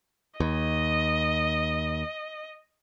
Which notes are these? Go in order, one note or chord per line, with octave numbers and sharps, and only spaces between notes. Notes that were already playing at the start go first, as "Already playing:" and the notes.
D#2 D#5